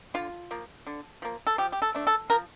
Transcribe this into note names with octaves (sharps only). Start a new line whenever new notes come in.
D3 F4
F3 A#3
D3
F3 A#3
A4
F3 G4
G4
A4
A3 D4
A4
F3 A#4